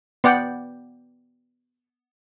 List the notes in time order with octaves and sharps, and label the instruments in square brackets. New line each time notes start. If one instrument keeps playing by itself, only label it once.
[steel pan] B3 D5 F#5 G5